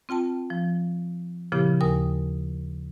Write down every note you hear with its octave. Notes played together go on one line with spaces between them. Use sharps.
C4 F4 G5 A5
F3
A#2 C#3 F3 B3 E4 G4
D#2 A#4 G#5 D#6